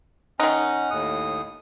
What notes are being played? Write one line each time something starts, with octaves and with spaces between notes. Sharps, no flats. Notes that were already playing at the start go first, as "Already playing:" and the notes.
D#3 C#4 D#4 F#5
D#2 A2 D#6